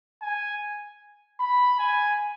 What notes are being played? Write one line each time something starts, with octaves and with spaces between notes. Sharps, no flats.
G#5
B5
G#5